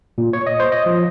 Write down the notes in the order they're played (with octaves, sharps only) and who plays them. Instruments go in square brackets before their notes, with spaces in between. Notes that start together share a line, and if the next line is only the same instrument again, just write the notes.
[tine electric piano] A#2
C#5
D#5
C5
D#5
F3